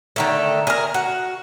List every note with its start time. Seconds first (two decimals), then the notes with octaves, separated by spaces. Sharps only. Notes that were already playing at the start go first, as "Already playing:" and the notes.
0.16 D3 D#3 A3
0.67 G#4 A#4
0.94 F#4